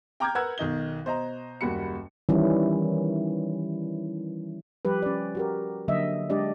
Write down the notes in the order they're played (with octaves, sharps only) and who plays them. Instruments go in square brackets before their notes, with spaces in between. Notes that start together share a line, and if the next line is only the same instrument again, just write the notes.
[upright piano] G5 A#5 D6 F6 G6 G#6
A#4 B4 F#5 E6 F#6 G#6
B1 D#3 D#5 G7
B2 C5 D#5 A#5
F#1 D#2 G3 F#4 B5 C#7
[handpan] D#3 E3 G3 C#4 E4
F3 G3 G4 B4
C#4 D5
F#4 G4 A#4
D3 F#3 A#3 D#5 E5
G#3 D4 G4 D5 D#5